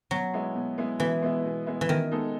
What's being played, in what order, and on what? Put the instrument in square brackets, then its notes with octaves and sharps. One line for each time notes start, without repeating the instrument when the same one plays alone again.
[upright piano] B2 [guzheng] F#3
[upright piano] G#3 B3 E4
B2
G#3 B3 E4
[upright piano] B2 [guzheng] E3
[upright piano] G#3 B3 E4
B2
G#3 B3 E4
[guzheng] E3
[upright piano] B2 [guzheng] D#3
[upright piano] G#3 B3 D#4 A4